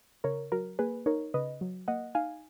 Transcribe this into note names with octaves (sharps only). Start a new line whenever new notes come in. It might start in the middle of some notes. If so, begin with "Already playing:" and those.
C#3 A#4 C#5
F#3 A#4
A#3 G#4 B4
D#4 A#4 C#5
C#3 B4 D#5
F#3
A#3 D#5 F#5
D#4 F5 G#5